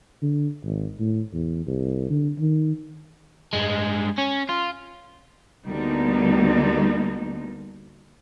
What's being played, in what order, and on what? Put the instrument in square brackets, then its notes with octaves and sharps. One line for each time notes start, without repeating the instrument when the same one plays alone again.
[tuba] D3
G#1
A2
E2
C2
D3
D#3
[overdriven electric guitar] G2 G#3
C#4
F4
[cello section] D2 D3 G3 A#3 B3 D#4